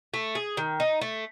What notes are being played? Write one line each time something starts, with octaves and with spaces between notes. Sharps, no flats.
A3
G#4
D#3
D#4
A3